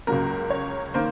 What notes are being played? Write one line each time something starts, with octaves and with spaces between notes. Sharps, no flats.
C#2 C#3 F#3 A#3 A#4
C#5
D#3 A#3 C5